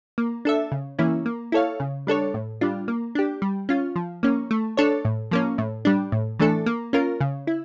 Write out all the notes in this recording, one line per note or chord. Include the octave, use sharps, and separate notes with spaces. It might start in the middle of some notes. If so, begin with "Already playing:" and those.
A#3
D4 A4 E5
C#3
E3 A#3 C#4 E4
A#3
E4 A4 C#5 F5
C#3
G3 D4 A4 C#5
A2
G3 D4 F4
A#3
D4 G4
G3
C#4 F4
F3
A#3 C#4
A3
D4 A4 C#5
A2
F3 A#3 C#4
A2
G3 D4
A2
E3 A3 D4 A4
A#3
C#4 F4 A#4
C#3
E4